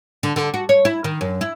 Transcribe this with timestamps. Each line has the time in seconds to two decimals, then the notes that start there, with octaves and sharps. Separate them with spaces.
0.23 D3
0.36 D3
0.54 F#4
0.69 C#5
0.85 E4
1.04 D#3
1.21 F#2
1.41 E4